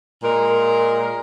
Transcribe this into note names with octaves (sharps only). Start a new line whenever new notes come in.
A#2 G#3 A#4